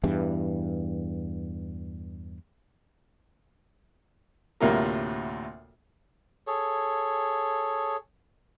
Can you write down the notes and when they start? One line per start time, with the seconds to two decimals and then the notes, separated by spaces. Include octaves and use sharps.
0.04 E2 G2 E3
4.60 D2 A2 C3 A#3 F4 A#4
6.47 G#4 A4 C#5